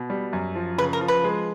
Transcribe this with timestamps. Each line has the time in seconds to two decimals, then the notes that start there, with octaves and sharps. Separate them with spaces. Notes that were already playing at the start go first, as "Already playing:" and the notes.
Already playing: B2
0.10 G3
0.33 F#2
0.55 F3
0.78 C#3 B4
0.93 A#4
1.01 F3
1.08 B4
1.24 G#3